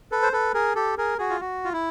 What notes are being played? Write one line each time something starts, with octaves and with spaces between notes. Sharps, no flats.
A4 B4
C5
A4 B4
G#4 A#4
G4 A4
G#4 A#4
F#4 G#4
F4
F#4
F4
E4